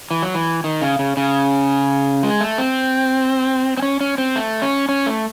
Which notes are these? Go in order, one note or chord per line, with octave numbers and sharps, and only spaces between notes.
E3
F#3
E3
D#3
C#3
C#3
C#3
G#3
A3
C4
C4
C#4
C#4
C4
A3
C#4
C#4
A3